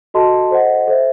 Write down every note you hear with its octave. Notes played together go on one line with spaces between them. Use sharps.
F#4 A4 D#5 A5 C6
A4 C5 D#5 F#5
A4 C5 E5